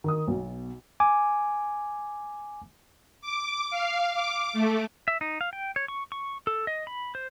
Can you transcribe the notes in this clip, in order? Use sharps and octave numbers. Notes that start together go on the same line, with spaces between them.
D#3 D#6
B1 B2
G#5 D6
D6
F5
D6
A3
E5
D#4
F5
G5
C#5
C#6
C#6
A4
D#5
B5
C5